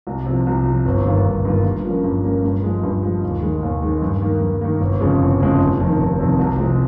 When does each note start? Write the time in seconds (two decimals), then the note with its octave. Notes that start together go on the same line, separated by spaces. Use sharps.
0.07 C2
0.26 C3 F3
0.46 C2
0.66 C3 F3
0.86 G1
1.05 G2 D#3 A#3 F4
1.25 G1
1.45 G2 D#3 A#3 F4
1.65 G2
1.84 F3 A#3 C#4
2.04 G2
2.24 F3 A#3 C#4
2.44 G2
2.63 F3 G#3
2.83 G2
3.03 F3 G#3
3.22 D#2
3.42 D#3 G#3
3.63 D#2
3.82 D#3 G#3
4.02 G2
4.22 D#3 A#3
4.41 G2
4.61 D#3 A#3
4.81 G1
5.01 F2 C#3 F3 G#3
5.20 G1
5.40 F2 C#3 F3 G#3
5.60 F1
5.80 F2 C3 D#3
6.00 F1
6.19 F2 C3 D#3
6.39 C2
6.59 C3 F3 G#3